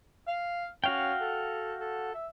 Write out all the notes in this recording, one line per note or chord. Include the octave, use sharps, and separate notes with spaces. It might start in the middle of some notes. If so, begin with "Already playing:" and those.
F5
C#4 F#4 F5 G5
A4
A4
E5